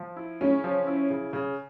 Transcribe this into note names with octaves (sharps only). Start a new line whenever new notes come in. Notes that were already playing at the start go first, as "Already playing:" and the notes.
Already playing: F3
E4
C#3 C#4
F3
E4
C#3
C#3